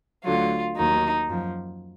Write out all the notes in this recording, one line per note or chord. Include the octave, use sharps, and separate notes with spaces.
D2 D3 F#3 F4
D#2 D#3 F#3 D#4
F#2 F3